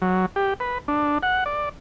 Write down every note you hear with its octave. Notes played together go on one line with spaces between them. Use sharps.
F#3
G4
B4
D4
F#5
D5